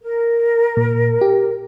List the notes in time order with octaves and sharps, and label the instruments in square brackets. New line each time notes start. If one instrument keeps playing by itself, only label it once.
[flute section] A#4
[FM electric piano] A#2
G4